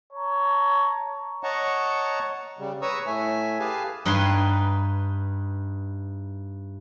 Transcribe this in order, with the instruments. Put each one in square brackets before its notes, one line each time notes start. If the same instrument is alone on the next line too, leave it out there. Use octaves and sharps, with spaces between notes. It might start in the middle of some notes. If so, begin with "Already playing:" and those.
[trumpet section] C#5 A5 A#5
[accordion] C#5 D#5 F#5 A5 A#5 C#6
C#3 G3
B4 C#5 A#5 C#6 D#6 E6
A2 A3 E5 G#5
G4 G#4 B4 F5 G#5 A5
[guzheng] G2 D#4 B4 G#5 C6